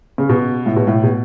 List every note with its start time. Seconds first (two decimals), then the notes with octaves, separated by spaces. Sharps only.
0.18 C#3
0.29 B2
0.66 A2
0.76 B2
0.87 A2
1.03 B2